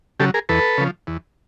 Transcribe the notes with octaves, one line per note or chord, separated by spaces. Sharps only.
C#3 F#3 G4 A4
G#4 A#4
E2 A4 B4
C#3 F3
E2